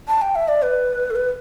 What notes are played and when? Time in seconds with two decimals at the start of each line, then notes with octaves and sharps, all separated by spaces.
0.08 A5
0.22 G5
0.35 E5
0.48 D5
0.62 B4
1.10 A4
1.15 B4